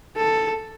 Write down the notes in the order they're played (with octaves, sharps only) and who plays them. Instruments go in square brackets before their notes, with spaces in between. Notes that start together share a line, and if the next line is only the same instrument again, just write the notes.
[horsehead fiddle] A4